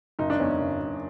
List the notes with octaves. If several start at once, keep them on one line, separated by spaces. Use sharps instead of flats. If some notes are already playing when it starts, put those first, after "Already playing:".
F#1 D#4
D4
E2 C#4
F#1
F#1